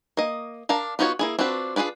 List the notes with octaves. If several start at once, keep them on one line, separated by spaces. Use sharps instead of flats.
A#3 D#5
D4 A#4 F5 A5
B3 D#4 F4 F#4 C#5
A#3 E4 G#4
C4 D4 F4 F#4 B4
D4 F4 G#4 B4 D5